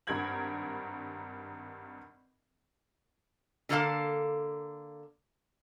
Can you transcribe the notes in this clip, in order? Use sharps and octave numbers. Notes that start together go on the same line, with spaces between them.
G#1 G2 A#4 B5 G#6 F#7
D3 A#3 A4 C5 F5 A5